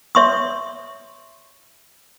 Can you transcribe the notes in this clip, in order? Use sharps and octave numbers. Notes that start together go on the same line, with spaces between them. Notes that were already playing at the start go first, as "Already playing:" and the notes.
C#5 E5 C6 C#6 D#6